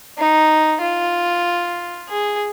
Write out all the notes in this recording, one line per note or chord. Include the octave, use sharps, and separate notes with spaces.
D#4
F4
G#4